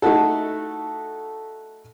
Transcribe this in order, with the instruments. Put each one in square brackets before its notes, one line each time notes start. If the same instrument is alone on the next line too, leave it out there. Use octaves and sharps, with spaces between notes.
[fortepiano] A3 D#4 E4 F#4 A4